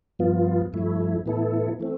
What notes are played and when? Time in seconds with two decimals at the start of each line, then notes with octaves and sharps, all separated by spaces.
0.19 G2 F3 B3 F4
0.73 G2 F3 A3 E4
1.26 A2 E3 B3 E4 A4
1.80 E3 A3 C4